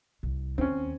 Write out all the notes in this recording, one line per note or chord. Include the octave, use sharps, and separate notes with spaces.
C2
D#2 C4 C#4